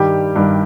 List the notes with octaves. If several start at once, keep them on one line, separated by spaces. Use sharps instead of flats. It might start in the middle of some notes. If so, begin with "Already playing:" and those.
Already playing: G2 D#3 G3 G4
G2 D#3 G3